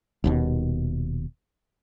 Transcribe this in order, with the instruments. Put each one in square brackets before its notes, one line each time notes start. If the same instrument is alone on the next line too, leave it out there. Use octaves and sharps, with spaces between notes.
[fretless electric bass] D#1 D#2 B2